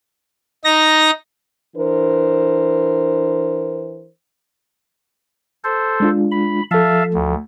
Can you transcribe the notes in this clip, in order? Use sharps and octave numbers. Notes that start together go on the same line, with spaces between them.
D#4 A#6
E3 D4 A#4 C5
A4 C5
G#3 D4 F4
B5
F3 A4 E5 F5 A5
D2